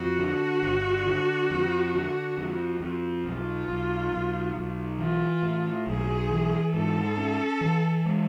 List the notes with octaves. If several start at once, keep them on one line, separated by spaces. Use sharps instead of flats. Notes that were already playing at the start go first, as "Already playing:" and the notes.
Already playing: F2 F#4
D3
G1
D3
F2
D3
F2
F2
B1 F4
B1
B1
B1
E3 F4
A2
B1 G#4
E3
G#2 A4
C#4
E3
G#3